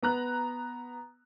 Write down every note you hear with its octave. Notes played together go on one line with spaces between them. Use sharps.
B3 A#5 F#6